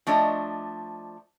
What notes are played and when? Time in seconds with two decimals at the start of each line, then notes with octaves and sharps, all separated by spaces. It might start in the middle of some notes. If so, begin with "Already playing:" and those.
0.07 F3 A3 D4 C#5 D#5